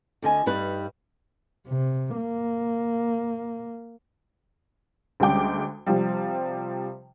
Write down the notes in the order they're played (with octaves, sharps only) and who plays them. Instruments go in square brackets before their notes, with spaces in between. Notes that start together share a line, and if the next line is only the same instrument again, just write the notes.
[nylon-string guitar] D2 D3 D#5 G#5
G2 G3 D#4 B4
[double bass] C3
A#3
[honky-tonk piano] D2 G3 G#3 C#4 G5 D6
C3 F3 G3